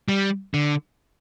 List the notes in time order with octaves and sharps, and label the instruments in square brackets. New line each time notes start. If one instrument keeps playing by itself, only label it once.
[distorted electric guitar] G3
D3